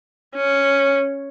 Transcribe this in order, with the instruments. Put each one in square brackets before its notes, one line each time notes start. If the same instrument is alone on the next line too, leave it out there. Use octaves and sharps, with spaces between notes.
[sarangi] C#4